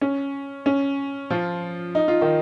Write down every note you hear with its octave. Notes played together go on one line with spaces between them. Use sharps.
C#4
C#4
F3 F4
D#4
F4
D#3 D#4